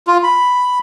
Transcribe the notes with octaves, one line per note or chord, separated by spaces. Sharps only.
F4
B5